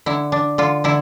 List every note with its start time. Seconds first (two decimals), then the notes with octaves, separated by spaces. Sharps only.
0.06 D3 E4
0.32 D4
0.58 D3 F4
0.84 D3 E4